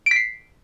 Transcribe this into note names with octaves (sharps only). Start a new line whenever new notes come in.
B6 C7 D7